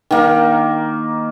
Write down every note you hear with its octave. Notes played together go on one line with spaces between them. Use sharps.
D#3 A#3